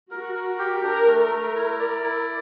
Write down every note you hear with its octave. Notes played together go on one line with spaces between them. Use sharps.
F#4 A#4
A#4
G4
D4 A#4
A3
A#4
A3
E4
D5
E4